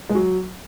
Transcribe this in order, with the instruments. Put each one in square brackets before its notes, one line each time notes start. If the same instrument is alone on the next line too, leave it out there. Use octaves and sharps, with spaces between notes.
[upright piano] G#3
F#3